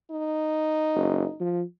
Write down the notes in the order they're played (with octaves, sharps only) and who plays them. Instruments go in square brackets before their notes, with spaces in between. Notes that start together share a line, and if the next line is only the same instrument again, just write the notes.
[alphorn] D#4
[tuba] F#1
F3